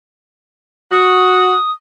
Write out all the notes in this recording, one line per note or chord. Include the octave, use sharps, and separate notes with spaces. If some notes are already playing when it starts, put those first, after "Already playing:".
F#4 D#6